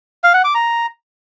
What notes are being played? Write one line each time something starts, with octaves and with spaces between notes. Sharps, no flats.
F5
F#5
D6
A#5